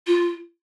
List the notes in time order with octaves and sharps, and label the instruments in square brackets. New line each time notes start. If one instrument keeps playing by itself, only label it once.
[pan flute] F4